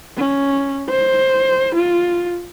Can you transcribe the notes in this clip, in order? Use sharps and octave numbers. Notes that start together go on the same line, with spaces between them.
C#4
C5
F4